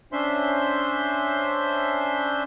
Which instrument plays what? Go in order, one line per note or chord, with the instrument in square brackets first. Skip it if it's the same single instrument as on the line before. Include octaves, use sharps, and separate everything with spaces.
[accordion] C#4 D4 C5 E5 C6